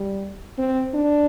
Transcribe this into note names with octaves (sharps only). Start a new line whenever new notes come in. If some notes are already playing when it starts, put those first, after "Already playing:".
Already playing: G3
C4
D4